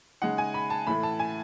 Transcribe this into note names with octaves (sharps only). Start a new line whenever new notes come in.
C#3 G#3 D#4 F#5
G#5
B5
A5
A2 E3 A3 B5
A5
G#5